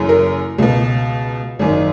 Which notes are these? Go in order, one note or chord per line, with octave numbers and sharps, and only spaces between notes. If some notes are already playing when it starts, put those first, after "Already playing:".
Already playing: F#1 F#2 E3
A#4
C#2 B2
G#1 F#2 D#3